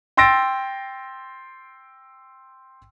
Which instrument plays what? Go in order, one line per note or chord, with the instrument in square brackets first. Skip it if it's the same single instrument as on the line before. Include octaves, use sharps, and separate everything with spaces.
[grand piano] G5 C6 E6 A6 A#6 D7